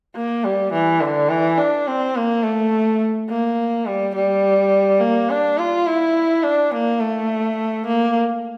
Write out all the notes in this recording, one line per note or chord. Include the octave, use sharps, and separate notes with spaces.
A#3
G3
E3
D3
E3
D4
C4
A#3
A3
A#3
G3
G3
A#3
D4
F4
E4
D4
A#3
A3
A#3